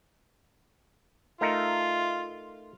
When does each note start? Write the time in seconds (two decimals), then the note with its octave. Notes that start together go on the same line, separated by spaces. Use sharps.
1.41 A3 D#4 F4 A#4